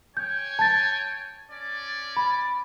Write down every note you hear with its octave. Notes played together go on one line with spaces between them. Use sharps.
C#5 G5 G#5 G6
A5 A6
C#4 D5
B5